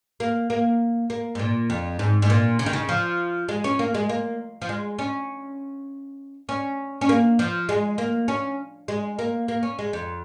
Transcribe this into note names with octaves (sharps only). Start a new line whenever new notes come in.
A#3
A#3
A#3
G#2
A#2
F2
G#2
G#2
A#2
C#3
D#3
C#3
F3
G#3
C#4
A#3
G#3
A#3
F3
G#3
C#4
C#4
C#4
A#3
F3
G#3
A#3
C#4
G#3
A#3
A#3
C#4
G#3
F2